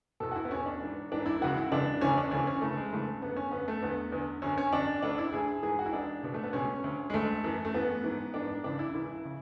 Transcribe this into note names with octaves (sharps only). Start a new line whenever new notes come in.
E2 B2 A4
F#4
E4
B3
E2 B2 C#4
D4
G#2 E3
G#2 E3 D4
E4
C#2 C#3 E3 F#4
E4
C#2 C#3 E3 D4
D2 C#3 E3 C#4
D4
D2 C#3 E3 C#4
C#4
D2 C#3 E3 A3
G#3
D2 C#3 E3 A3
F#2 D3 B3
C#4
F#2 D3 B3
A3
E2 D3 B3
E2 D3
F#2 D3 C#4
C#4
F#2 D3 D4
D2 D3 D4
E4
D2 D3 G#4
G#2 E3 G#4
F#4
E4
G#2 E3 D4
C#2 B2
A3
B3
C#2 B2 C#4
D2 D3
G#3
D2 D3 A3
F#2 E3
A3
F#2 E3 B3
G#2 E3
G#2 E3 D4
D4
C#2 C#3 E3 D4
E4
C#2 C#3 E3 E4
C#3